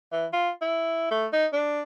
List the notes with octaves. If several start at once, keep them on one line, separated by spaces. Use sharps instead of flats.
E3
F4
E4
A3
D#4
D4